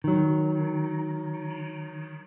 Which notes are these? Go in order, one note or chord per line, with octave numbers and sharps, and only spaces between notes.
D#3 F#3